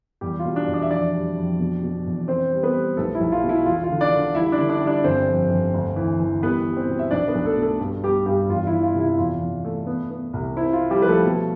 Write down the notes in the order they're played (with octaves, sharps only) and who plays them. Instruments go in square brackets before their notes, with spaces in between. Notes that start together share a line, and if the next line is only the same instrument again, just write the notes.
[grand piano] E2 G3 G4
F4
B2
D4 D5
E2
D4 D5
E5
F2 D4 D5
G3
F2
B2
B2
E2
C4 C5
G3
B3 B4
G3
B1 A3 A4
E4
B1
F4
B2
E4
E1 F4
F4
D3
D4 D5
D3
G3 E4 E5
D4 D5
D3
D4 D5
G3
D4 D5
G1 C4 C5
F2
G1
D2
E3
E3
G3 B3 B4
G3
C4 C5
B2
E5
B1 D4 D5
B3 B4
B1
A3 A4
B2
A3 A4
G2
G3 B3 G4
G2 G3 G4
E2 F4
E4
E3
F4
C3
E4
E2 F4
E2
A3
B3
B3
C2
C4 E4
F4
C4
G3 G4
F3 B4
A3 A4
B2